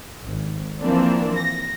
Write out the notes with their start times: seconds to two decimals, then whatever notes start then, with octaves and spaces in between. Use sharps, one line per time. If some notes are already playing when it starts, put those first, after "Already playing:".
0.24 G#1
0.82 E3 F3 A#3 C4 D4
1.37 A#6